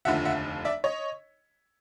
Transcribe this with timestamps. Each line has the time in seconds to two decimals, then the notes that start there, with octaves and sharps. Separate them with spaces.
0.05 F1 D#2 D3 F3 E5 F#5
0.25 E5 F#5
0.65 D5 E5
0.84 C#5 D#5